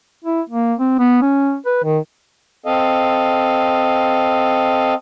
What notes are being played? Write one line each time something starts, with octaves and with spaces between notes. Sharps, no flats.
E4
A#3
C4
B3
C#4
B4
D#3
C4 A4 D#5 F5